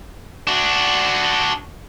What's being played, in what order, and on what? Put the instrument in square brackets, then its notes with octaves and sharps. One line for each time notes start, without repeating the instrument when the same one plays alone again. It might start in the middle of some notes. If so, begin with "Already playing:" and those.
[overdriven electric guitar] D4 F#4